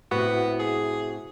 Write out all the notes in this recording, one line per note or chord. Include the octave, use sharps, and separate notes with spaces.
A2 C3 B3 F#4
G#4